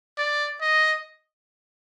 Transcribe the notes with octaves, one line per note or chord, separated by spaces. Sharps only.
D5
D#5